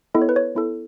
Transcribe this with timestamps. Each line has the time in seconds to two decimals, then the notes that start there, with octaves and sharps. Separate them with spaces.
0.14 B3 E4 A4 D#5
0.22 C#5
0.29 B4
0.36 C#5
0.55 B3 E4 A4